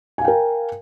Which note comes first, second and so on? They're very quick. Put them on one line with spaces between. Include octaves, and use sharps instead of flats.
G#5 F5 G5 A#4